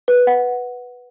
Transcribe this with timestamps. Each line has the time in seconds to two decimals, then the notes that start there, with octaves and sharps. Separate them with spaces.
0.08 B4
0.27 F#5